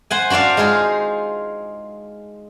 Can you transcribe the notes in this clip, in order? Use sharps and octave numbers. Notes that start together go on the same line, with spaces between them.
C5 F#5 G#5
D4 F#4 C5 D5 F5
G#3 D#4 F4 G#4